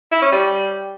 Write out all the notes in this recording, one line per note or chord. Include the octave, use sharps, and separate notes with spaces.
E4
C#4
G3